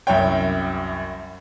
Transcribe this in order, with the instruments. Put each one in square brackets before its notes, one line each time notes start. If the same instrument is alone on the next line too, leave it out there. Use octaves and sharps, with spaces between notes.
[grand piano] C2 F#2 E4 C#5 G5